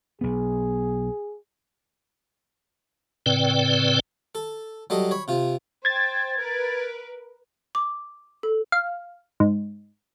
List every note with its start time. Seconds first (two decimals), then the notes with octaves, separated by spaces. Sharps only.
0.21 B1 B3 G#4
3.26 A2 C#3 C4 B4 D5 G5
4.35 A4
4.90 F#3 G3 A4 D#5
5.11 C#5 B5
5.28 C3 F4
5.85 C5 G5 G#6 A6
6.39 A#4 B4
7.75 D6
8.43 A4
8.72 F5
9.40 G#2